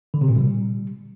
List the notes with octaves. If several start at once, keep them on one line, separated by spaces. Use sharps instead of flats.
D3
C3
A#2
G3